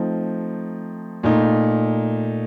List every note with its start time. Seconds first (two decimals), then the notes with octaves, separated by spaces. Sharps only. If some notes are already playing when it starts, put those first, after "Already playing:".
Already playing: F3 A3 C4 D#4
1.23 A#2 A3 D#4